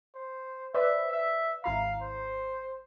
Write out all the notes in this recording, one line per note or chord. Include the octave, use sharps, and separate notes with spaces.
C5
B4 C5 D5 E5
E5
G#1 E4 F5 A#5
C5